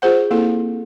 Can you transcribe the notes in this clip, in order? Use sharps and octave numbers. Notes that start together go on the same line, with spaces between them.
F4 G#4 C5 F#5
A#3 C4 E4 A4